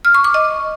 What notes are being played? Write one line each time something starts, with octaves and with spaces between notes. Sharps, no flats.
F6
C#6
D6
D#5